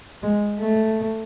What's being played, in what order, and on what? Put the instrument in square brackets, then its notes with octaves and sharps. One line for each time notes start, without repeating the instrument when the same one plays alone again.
[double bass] G#3
A3